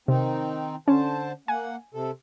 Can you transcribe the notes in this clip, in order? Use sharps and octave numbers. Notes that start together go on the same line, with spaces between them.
C3 D#3 C4 D#4
D3 C#4 C5 A5
A#3 F#5 G#5
C3 A4